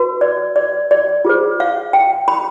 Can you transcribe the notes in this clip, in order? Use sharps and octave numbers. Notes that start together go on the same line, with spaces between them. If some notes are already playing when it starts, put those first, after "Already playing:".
Already playing: F#4 B4
D5
D5
D5
F4 G#4 C5
F5
G5
B5